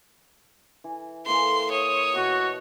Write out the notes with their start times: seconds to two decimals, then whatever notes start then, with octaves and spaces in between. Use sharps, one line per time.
0.84 E3
1.26 E3 A#3 A4 C6
1.72 C#5 D#6
2.15 B2 B3 F#4